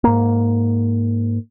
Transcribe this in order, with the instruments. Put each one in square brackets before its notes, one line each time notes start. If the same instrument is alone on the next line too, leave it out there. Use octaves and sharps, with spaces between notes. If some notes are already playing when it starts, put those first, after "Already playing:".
[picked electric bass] G#2 A#3